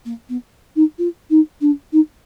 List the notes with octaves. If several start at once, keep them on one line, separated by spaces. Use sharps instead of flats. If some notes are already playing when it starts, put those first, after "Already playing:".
A#3
B3
D#4
F4
D#4
D4
D#4